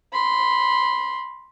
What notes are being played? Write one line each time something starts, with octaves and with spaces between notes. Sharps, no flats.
B5 C6